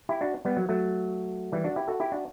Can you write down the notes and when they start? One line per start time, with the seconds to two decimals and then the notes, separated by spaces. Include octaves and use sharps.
0.09 E4 G4
0.21 D4 F#4
0.45 G3 B3
0.57 F#3
0.69 F#3 A3
1.52 E3 G3
1.64 D4 F#4
1.76 E4 G4
1.88 F#4 A4
2.00 E4 G4
2.12 D4 F#4